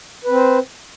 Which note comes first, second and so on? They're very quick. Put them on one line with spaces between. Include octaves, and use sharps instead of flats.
B4 C4 C5